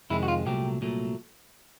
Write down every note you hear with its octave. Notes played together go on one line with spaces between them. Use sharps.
F2 C3 D#3 G#3 C4 E4
F#4
F4
C2 A#2 F#3 A3 G4
C2 A#2 F#3 A3